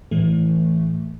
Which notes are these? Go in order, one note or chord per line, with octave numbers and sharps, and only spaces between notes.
A2 E3 A3